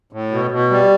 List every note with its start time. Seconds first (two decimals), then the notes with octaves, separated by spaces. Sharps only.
0.13 A2
0.31 B2
0.51 B2
0.70 G3